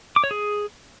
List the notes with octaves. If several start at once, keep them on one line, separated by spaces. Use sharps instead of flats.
D6
C#5
G#4